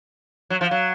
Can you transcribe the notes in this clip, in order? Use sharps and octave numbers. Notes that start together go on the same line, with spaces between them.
F#3
F3
F#3